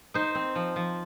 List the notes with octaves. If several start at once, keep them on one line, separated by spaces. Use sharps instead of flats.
D#4 C5
C4
F3
F3